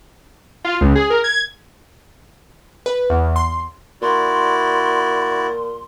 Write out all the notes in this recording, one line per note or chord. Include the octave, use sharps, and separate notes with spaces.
F4
C#2
G#4
A#4
G#6
B4
E2
C6
A#2 E4 F#4 D5 C6